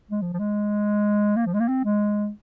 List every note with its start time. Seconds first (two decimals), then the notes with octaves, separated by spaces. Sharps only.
0.11 G#3
0.22 F3
0.33 F3
0.39 G#3
1.37 A#3
1.46 F3
1.54 G#3
1.60 A#3
1.68 C4
1.85 G#3